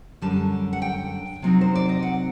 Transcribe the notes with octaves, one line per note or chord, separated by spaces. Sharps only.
F#2 D3 G3 A5
F#5
G5
C3 F#3 C4 D#4
C5
D5
D#5
F#5